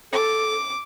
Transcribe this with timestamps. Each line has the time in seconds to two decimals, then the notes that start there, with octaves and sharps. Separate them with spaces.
0.13 A4 D6